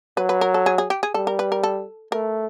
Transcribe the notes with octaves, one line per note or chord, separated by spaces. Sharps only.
F#3 B4
B4
A#4
A4
G#4
G#4
G4
G#4
G3 A4
A#4
B4
A#4
A4
A3 A#4